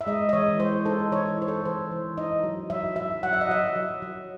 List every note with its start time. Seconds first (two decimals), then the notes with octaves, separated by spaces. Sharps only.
0.01 E5
0.07 G#3 D#5
0.29 D#5
0.33 E3 C#5
0.59 G#3 C5
0.86 D#4 A4
1.12 E3 C#5
1.38 E3 C5
1.48 A4
1.66 E3 C5
1.92 E3
2.17 D#4 D#5
2.44 F#3
2.70 F#3 E5
2.96 F#3 E5
3.23 F#3 F#5
3.33 E5
3.41 D#5
3.48 F#3 E5
3.76 F#3
4.02 F#3